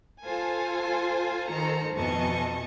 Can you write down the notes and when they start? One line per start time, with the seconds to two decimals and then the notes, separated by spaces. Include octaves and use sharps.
0.23 F4 A4 C5 G#5
1.50 D#3 A4 C5 A#5 C#7
1.94 F2 B2 E3 D#5 A5 C#6